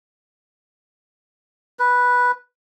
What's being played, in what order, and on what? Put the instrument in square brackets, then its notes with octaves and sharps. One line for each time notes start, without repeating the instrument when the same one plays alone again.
[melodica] B4